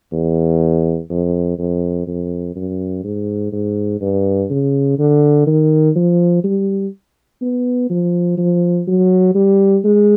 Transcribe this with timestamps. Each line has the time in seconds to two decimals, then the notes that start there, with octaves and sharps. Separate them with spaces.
0.12 E2
1.10 F2
1.58 F2
2.07 F2
2.55 F#2
3.04 G#2
3.52 G#2
4.01 G2
4.50 C#3
4.99 D3
5.47 D#3
5.96 F3
6.44 G3
7.42 B3
7.90 F3
8.38 F3
8.87 F#3
9.35 G3
9.84 G#3